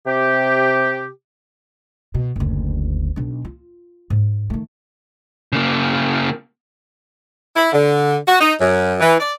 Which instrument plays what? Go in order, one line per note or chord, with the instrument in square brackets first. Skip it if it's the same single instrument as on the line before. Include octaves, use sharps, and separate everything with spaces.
[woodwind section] C3 G4
[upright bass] B2
F#1 D2
B1 D4
F4
G#2
D#3 A3
[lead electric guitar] C#3 A#3
[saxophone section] E4
D3
F#4
D#4
F#2
E3
D5